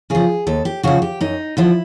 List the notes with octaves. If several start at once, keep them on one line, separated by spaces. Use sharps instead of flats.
C#3 F3 G#4
D#2 A4
G4
C#3 F3 F#4
G4
F#2 D#4
D3 F3 E4